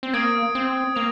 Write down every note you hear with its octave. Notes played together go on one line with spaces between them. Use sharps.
C4
A#3 D#6 G#6 D7
C4
A#3 F7